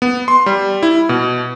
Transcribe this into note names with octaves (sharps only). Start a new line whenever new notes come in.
B3
C6
G3
E4
B2